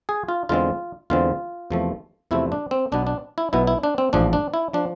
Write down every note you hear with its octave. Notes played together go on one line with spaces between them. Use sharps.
G#4
F4
E2 D3 G#3 C4 F4
E2 D3 G#3 C4 F4
E2 C3 F3 A3 C4
E2 C3 F3 A3 C4 E4
D4
C4
B1 B2 B3 D4
D4
E4
B1 B2 B3 E4
E4
D4
C4
A1 G#2 F3 D4
D4
E4
F3 D4